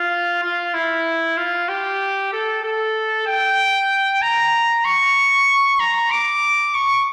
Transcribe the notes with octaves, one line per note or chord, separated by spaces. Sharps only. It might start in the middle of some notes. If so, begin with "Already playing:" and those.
Already playing: F4
F4
E4
F4
G4
A4
A4
G5
A#5
C#6
A#5
D6
C#6